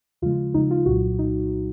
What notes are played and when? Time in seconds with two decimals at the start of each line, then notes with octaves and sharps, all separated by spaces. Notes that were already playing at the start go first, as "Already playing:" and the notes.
0.22 D#2 C#3 F3 G#3 F4
0.54 D#2 C#3 F3 G#3 D#4
0.71 F4
0.86 C2 A#2 F#3 F#4
1.19 A#2 D#4